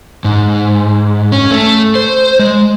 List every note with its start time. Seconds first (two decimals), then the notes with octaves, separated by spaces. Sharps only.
0.25 G#2
1.32 C#4
1.51 A3
1.95 C5
2.39 G#3